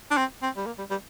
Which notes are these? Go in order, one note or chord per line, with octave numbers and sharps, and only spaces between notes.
D4
C4
C4
G3
A#3
G3
G3